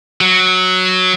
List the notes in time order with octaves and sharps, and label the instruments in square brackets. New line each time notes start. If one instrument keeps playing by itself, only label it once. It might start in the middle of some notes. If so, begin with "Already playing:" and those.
[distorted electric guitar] F#3